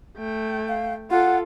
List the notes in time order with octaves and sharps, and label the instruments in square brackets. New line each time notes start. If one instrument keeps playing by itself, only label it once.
[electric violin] A3 G5
[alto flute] F5
[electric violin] F4 A4 [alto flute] F#5